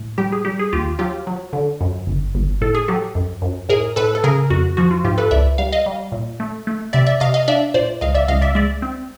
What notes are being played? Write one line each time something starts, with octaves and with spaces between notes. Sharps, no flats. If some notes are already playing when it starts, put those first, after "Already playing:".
Already playing: A2
G3 G4
G#4
G3 G4
G#4
D#2 F4 G4
F#3 F4 G4
F#3
D3
F#2
G1
G1
A2 A4
G#4
F#3 G4 A4
F#2
F#2
A2 G#4 A#4
A2 A4 B4
A4
C#3 G#4 A#4
F2 F#4
F3 F#4
F4
G#2 F4 G4
A4 B4
C#2 D5 E5
G3 F5
D#5 F5
G3
A#2
A3
A3
C3 D5 E5
D5 E5
C3 D#5 F5
D#5 F5
D4 D5 E5
A#2 C5 D5
C#2 D#5 F5
D5 E5
C#2 D#5 F5
D5 E5
G#3 D5 E5
C4